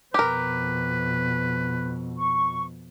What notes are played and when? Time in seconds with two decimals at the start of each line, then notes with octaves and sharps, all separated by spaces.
0.14 F2 B2 G4 A#4 B4
2.17 C#6